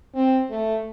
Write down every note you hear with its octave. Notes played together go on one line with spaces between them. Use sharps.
C4
A3